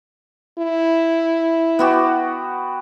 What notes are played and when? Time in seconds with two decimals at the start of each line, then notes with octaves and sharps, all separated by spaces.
0.59 E4
1.79 B3 F#4 G4